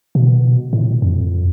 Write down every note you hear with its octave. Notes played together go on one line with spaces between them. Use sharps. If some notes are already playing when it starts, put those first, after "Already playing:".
B2
A2
F2